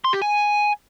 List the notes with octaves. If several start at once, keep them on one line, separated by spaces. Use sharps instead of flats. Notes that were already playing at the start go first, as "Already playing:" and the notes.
C6
G4
G#5